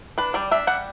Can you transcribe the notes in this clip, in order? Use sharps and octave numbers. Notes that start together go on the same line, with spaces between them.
D4 B4
G3 D5
D4 E5
G3 F#5